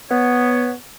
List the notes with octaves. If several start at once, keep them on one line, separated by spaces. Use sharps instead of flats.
B3 C#5